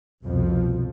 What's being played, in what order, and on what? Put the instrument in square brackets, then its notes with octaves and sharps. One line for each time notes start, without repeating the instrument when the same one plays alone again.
[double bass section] C2 F2 B2 F3